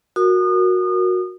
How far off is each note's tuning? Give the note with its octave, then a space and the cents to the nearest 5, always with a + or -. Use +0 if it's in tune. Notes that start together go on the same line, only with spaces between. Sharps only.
F#4 -15 A#4 +0 D#6 -35